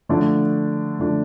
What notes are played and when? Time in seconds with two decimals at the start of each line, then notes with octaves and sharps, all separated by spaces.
0.09 D3 F3 A3 D4
0.99 D3 F3 A3 D4